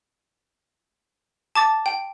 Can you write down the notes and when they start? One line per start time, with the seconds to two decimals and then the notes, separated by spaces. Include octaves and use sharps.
1.55 A5 D6 A6
1.86 G5